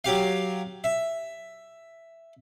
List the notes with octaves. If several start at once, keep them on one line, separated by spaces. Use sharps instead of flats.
F#3 G4 F5
E5